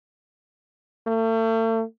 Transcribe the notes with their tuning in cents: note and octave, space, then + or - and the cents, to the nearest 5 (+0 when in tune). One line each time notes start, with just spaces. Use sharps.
A3 +40